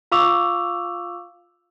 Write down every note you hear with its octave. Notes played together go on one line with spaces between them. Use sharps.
F4 F5 C#6 D6 E6 F7